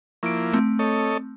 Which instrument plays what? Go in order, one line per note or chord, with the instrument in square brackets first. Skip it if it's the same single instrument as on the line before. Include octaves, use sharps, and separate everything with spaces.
[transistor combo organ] F3 A#3 E4 [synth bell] C#6 D7
[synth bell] A3 C4
[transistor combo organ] A4 C#5 D#5